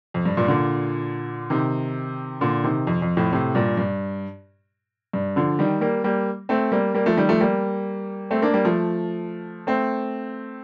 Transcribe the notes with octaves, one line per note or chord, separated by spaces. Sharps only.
F2
G2
G2 A#2
A#2 D3
C3 D#3
A#2 D3
C3 D#3
F2
F2
F2 A2
A2 C3
G2 A#2
G2
G2
D3 F3
D#3 G3
G3 A#3
G3 A#3
A3 C4
G3 A#3
G3 A#3
F3 A3
D#3 G3
F3 A3
G3 A#3
A3 C4
A#3 D4
G3 A#3
F3 A3
A3 C4